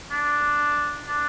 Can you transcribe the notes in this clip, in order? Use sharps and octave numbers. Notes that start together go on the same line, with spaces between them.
D4
D4